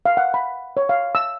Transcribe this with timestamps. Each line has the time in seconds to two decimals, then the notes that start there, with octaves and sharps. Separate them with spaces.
0.06 F5
0.17 F#5
0.34 B5
0.77 C#5
0.89 F5
1.15 E6